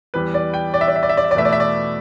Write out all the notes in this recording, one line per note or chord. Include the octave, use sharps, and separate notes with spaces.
E2 E3 G3 B4
D5
G5
D5
E5
D5
E5
D5
E5
D5
E5
D5
E2 B2 A3 E5
D5
E5
D5